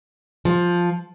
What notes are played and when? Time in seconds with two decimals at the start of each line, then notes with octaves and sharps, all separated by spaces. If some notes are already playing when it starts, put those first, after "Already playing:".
0.45 F3